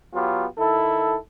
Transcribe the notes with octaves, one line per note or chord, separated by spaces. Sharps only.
F#3 B3 F4 G4
D#3 E4 A4